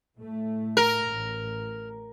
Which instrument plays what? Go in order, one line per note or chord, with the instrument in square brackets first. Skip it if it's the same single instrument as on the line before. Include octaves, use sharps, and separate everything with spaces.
[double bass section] A2 A3
[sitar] A#4
[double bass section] A1